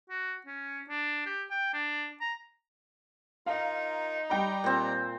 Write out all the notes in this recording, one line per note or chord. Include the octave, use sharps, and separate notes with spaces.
F#4
C#4
D4
G4
G5
D4
A#5
D#4 F4 A#4 F5
G3 D5 G5 A#5 B5
A#2 C4